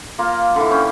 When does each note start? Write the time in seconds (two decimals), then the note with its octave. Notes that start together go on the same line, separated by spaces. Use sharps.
0.19 A#3 F4
0.56 D3 E3
0.71 C#4 G5 D6